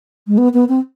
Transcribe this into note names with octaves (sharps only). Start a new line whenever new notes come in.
G#3
B3
B3
C4